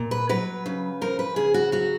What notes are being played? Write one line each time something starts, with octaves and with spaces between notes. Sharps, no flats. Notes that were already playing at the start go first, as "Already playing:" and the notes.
Already playing: A#2
B4
F#3 B4
C#3
F3 A#4
B4
C#3 G#4
F#4
F#3 F#4